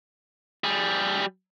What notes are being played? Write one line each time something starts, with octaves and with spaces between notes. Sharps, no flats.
G3 G#4